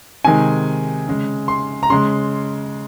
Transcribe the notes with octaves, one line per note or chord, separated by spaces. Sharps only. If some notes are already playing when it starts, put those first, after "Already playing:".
C3 D#3 G#3 G#5
C#3 G#3
C6
A#5
C#3 G#3 C6